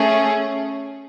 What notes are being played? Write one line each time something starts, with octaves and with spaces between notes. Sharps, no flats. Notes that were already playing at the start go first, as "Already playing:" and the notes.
Already playing: A3 C#4 G#4